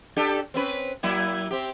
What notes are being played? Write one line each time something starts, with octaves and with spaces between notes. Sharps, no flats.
D4 G4 A4
C4 C#4 B4
F#3 A#3 E4
C4 G4